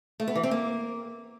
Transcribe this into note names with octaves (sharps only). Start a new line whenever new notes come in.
A3
B3
E3
C4
A#3